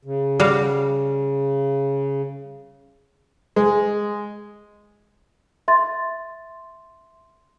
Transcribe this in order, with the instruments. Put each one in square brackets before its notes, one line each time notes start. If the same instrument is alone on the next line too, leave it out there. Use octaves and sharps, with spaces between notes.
[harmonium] C#3
[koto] G3 F#4 F5
[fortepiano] G#3
[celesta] E5 C6 A6